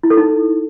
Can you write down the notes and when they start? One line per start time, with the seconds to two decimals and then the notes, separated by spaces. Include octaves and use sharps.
0.03 E4
0.10 A4
0.17 D#4